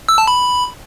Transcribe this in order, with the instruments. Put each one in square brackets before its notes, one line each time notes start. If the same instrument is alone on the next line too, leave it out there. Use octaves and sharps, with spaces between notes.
[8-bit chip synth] E6
A5
B5